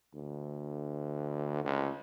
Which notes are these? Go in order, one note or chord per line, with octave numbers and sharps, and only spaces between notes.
D2
C#2